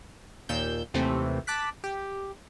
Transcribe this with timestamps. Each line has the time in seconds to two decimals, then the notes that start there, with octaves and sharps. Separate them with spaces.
0.49 D#2 A#2 E6 G6
0.94 D#2 C3 E3 A3 C4
1.47 A5 D6 F#6 B6
1.84 G4